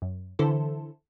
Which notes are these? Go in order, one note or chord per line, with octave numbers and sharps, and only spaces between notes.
F#2
D3 E3 E4 A4 C5